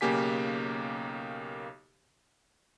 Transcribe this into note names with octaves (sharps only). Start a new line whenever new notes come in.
B1 C#3 A#3 G4 G#5 B6